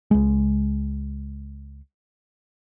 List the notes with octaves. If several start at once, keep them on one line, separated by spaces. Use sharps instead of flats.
C#2 G#3